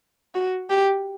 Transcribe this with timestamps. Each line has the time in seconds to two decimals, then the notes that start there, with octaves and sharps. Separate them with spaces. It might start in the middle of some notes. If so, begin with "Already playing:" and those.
0.35 F#4
0.70 G4